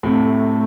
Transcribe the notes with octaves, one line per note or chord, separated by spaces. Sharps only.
A2 C3 A3
A3